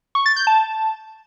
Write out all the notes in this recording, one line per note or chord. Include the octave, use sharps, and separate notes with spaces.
C#6
A6
G6
A5